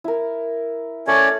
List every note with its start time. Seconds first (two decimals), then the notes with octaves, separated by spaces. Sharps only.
0.04 E4 A#4
1.07 A3 C#4 C#5 D5 A5